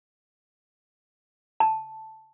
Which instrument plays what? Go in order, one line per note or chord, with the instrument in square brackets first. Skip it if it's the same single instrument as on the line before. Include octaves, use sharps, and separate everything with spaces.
[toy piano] A5